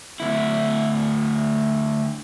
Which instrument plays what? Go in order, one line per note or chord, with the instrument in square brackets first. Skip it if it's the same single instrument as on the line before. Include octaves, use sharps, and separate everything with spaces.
[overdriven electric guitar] D2 E4